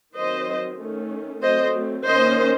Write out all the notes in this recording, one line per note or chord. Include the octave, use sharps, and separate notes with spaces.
D#3 F#3 C4 C5 D#5
D#3 A3 C#4
F#3 A3 C4 C5 D#5
D#3 A#3 C#4 C5 D#5